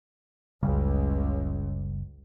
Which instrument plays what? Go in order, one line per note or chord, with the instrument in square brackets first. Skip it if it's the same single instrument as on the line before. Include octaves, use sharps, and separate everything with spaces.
[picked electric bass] F#1 C#3 G3 [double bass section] C#2